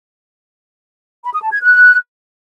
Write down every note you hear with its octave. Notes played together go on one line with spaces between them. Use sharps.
B5
D#6
A5
G#6
F#6